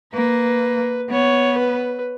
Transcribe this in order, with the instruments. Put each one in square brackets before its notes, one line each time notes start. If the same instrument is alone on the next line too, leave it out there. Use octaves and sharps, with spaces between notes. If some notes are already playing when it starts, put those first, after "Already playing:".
[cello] A#3 [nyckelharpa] B4
[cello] B3 [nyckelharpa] C#5
[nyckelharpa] B4